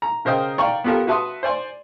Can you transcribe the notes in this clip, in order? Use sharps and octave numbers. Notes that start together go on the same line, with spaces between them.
A#5
C#3 A#4 C5 D#5 G5
D5 F5 G5 A#5 C#6
B3 F4 G4 A4 A#4
F#4 B4 E5 A5 C6 D#6
C5 D5 G#5 C6